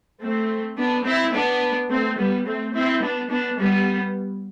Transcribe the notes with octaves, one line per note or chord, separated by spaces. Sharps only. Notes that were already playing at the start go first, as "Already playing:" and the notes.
A3 C4
B3 D4
C4 E4
B3 D4
A3 C4
G3 B3
A3 C4
C4 E4
B3 D4
B3 D4
G3 B3